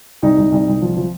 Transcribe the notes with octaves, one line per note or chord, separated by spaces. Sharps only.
C2 D#4
C2
C2
C2
F3
F3